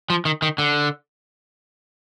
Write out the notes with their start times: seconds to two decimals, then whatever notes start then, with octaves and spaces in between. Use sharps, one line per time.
0.10 F3
0.25 D#3
0.42 D#3
0.58 D3